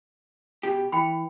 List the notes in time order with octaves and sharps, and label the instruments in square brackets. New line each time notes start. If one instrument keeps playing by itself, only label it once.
[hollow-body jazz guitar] B2 G4
[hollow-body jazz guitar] E3 [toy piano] G5 B5